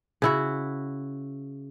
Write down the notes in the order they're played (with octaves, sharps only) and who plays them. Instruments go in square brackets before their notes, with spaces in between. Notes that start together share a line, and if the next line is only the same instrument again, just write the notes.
[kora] C#3 E4 F#4